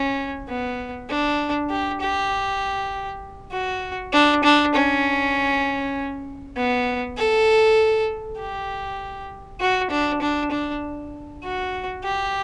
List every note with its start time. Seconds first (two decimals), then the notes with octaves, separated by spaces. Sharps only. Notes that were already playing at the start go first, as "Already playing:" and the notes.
Already playing: C#4
0.48 B3
1.09 D4
1.70 G4
2.01 G4
3.52 F#4
4.13 D4
4.44 D4
4.74 C#4
6.57 B3
7.17 A4
8.38 G4
9.60 F#4
9.91 D4
10.22 D4
10.51 D4
11.43 F#4
12.04 G4